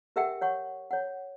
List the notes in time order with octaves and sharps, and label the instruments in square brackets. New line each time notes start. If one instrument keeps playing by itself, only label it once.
[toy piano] G4 A#4 E5 F#5 G5
C#5 F#5 C#6
C#5 F#5